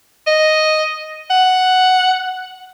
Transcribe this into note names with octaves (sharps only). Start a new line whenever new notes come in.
D#5
F#5